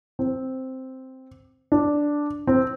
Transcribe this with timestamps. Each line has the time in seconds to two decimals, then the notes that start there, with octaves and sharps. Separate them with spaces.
0.19 C4
1.72 D4
2.47 C4